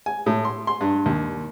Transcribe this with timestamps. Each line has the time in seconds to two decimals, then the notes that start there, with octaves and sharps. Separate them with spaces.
0.06 G#5
0.26 A2
0.45 C6
0.67 C6
0.81 G2
1.06 D#2